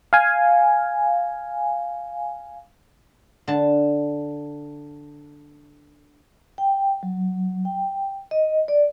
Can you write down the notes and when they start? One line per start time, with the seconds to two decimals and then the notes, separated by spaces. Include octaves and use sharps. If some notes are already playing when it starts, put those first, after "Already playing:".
0.13 F5 G#5
3.48 D3 A5
6.58 G5
7.03 F#3
7.65 G5
8.31 D#5
8.68 D5